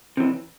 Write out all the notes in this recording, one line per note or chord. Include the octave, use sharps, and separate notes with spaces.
C3 E3